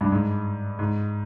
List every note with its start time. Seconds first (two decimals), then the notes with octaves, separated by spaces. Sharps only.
0.01 G2
0.12 G#2
0.79 G#2